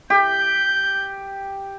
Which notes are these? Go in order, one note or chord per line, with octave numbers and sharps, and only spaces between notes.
G4 G6